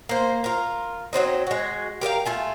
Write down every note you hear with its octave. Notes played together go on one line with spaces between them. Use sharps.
A#3 C5
F4 A#4
F#3 G3 C4 D#4
G#3 F#4
G4 A#4 D#5 F5
A3 F4 G#5